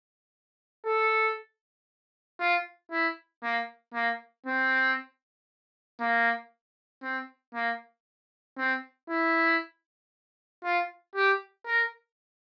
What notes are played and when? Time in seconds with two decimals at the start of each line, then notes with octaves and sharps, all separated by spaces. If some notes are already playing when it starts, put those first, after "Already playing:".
0.86 A4
2.40 F4
2.92 E4
3.43 A#3
3.94 A#3
4.46 C4
6.00 A#3
7.03 C4
7.55 A#3
8.58 C4
9.10 E4
10.64 F4
11.16 G4
11.67 A#4